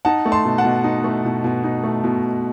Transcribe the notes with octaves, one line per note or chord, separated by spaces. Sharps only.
D#4 F#5 A5
A3
A5 C6
B2
F#5 A5
B2
D#4
A3
B2
B2
D#4
A3
B2